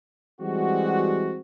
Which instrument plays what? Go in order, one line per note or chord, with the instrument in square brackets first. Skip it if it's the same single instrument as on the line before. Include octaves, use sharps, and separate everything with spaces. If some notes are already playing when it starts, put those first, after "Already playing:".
[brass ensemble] E3 G3 G#3 C4 F#4